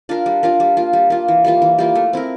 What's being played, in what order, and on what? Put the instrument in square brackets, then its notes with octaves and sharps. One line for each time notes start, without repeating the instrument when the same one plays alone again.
[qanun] D4 F4 A#4
G3
D4 F4 A#4
G3
A#3 F4
G3
A#3 F4
E3
G3 A#3 F4
E3
G3 A#3 F4
A3
C4 E4 A#4